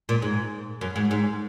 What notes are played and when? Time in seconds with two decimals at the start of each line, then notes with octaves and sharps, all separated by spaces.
0.09 A#2
0.22 G#2
0.81 F#2
0.96 G#2
1.11 G#2